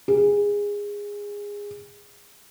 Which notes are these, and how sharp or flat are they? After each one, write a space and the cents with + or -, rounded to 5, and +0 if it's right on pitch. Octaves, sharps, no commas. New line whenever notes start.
G#4 -20